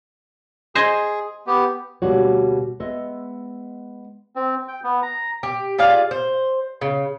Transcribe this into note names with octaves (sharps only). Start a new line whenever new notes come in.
G#4 C5 D#5 G#5
B3 G4
D2 B2 G3 A#3 F#4 C#5
G#3 B3 D#5 E5
C4
G5
B3
A#5
G4
F4 G#4 D5 F5
C5
C#3